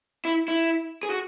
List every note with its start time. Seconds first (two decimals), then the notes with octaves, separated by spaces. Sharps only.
0.25 E4
0.48 E4
1.03 G#4
1.10 F#4